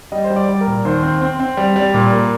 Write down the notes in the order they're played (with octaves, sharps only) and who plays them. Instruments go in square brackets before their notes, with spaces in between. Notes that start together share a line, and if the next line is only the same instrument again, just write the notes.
[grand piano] G3 D#5
C5
G3
D5
G3
A#4
A#2
D#2 C5
C4
C4
C4
G3
G3
A#2
A#3